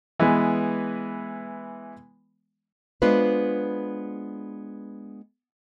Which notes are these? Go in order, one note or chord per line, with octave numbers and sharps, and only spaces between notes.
E3 G#3 B3
G#3 B3 D4 F4 B4 C5